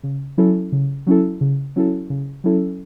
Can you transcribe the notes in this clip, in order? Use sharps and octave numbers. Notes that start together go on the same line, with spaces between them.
C#3
F#3 C#4 E4 A4
C#3
F#3 C#4 E4 A4
C#3
F#3 C#4 E4 A4
C#3
F#3 C#4 E4 A4